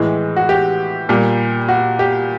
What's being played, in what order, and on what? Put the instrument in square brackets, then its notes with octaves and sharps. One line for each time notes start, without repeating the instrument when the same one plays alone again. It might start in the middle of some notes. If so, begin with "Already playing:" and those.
Already playing: [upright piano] A2 E3 G#3
F#4
G4
A#2 G3
F#4
G4